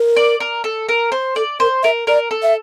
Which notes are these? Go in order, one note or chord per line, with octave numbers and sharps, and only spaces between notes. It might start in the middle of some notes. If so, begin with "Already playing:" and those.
Already playing: A#4
D5
A#4
A4
A#4
C5
A4 D5
A#4 C5
A#4 E5
A#4 D5
A4
E5